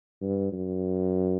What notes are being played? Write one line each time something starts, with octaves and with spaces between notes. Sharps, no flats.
G2
F#2